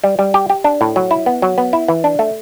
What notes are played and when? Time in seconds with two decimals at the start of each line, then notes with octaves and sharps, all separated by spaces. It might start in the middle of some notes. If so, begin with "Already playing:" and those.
0.04 G3
0.19 G3
0.34 G4
0.50 G4
0.64 D4
0.81 A2
0.96 F#3
1.11 E4
1.26 B3
1.42 F#3
1.58 B3
1.73 E4
1.88 E3
2.04 D4
2.19 A3